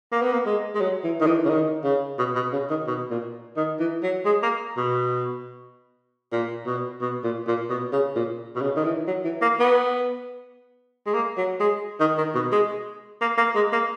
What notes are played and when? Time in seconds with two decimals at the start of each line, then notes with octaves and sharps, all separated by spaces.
0.12 A#3
0.22 B3
0.32 A#3
0.46 G#3
0.75 G#3
0.81 F#3
1.04 E3
1.20 D#3
1.26 E3
1.45 C#3
1.50 D#3
1.84 C#3
2.18 B2
2.35 B2
2.53 C#3
2.70 D#3
2.87 B2
3.11 A#2
3.57 D#3
3.79 E3
4.03 F#3
4.25 G#3
4.43 A#3
4.77 B2
6.32 A#2
6.66 B2
7.01 B2
7.24 A#2
7.47 A#2
7.70 B2
7.93 C#3
8.16 A#2
8.56 B2
8.61 C#3
8.77 D#3
8.85 E3
9.07 F#3
9.24 E3
9.42 A#3
9.60 B3
11.06 G#3
11.14 A#3
11.37 F#3
11.60 G#3
12.00 D#3
12.18 D#3
12.35 B2
12.52 G#3
13.21 A#3
13.38 A#3
13.55 G#3
13.73 A#3